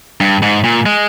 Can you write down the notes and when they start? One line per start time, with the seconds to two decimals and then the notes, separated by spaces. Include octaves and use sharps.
0.21 G2
0.43 G#2
0.64 A#2
0.86 G#3